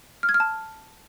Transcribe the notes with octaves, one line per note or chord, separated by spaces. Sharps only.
F6
G#6
F6
A5